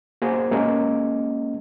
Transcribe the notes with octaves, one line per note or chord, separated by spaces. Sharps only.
A#3 F#4 G#4 C5
G#3 A#3 C#4 A#4 D#5